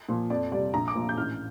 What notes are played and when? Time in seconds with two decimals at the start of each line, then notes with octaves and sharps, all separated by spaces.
0.09 A#2 F3
0.30 F2 D5
0.52 C3 G3 D5
0.74 A#1 A#5
0.88 D6
0.95 A#2 F3
1.09 G6
1.17 A1 F6